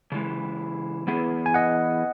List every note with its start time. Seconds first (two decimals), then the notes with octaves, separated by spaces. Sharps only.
0.12 C#3 E3 G#3
1.07 E3 B3 E4 G#4
1.46 G#5
1.54 D#5 F#5